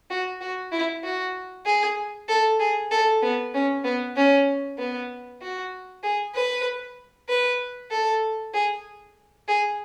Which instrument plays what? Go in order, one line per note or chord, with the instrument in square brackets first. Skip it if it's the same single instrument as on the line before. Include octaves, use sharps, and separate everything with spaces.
[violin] F#4
F#4
E4
F#4
G#4
A4
G#4
A4
B3
C#4
B3
C#4
B3
F#4
G#4
B4
B4
A4
G#4
G#4